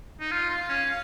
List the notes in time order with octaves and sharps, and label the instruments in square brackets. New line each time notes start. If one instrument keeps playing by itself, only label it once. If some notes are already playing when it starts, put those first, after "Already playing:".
[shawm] D#4
[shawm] F4 [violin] F5
[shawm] F4
C#4